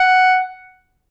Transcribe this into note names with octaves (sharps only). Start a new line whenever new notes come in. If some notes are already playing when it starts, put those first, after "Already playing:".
Already playing: F#5